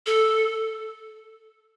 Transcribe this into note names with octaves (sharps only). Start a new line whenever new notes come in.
A4